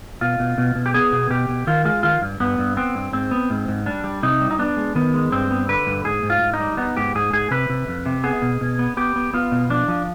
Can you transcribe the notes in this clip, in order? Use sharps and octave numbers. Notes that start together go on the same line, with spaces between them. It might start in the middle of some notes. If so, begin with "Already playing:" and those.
B2 F4
B2
B2
B2
G4
B3 G#4
B2
B2 G4
B2
D#3 F4
G#3 F4
D#3 F4
G2
G2 B3
G2
B3 C4
G2
G#2 C4
B3
G#2
G#2
G3 D4
G3
C3 D#4
G3
D#4
B3 D4
G#3
D#3 B3
G#3
G2 C4
B3
D3 B4
G2
G#2 G#4
G#2
F4
G#2
D#4
G3
B3 D#4
G#2 G4
G#2 G#4
G#2 G#4
C3 B4
C3
F2
C3
B3 G#4
B2
B2
B3
B3 G4
B3
B3 F4
B2
F3 D4
F3